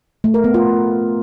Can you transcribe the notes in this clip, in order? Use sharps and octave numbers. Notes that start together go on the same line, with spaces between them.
A3
A#4
B3
F4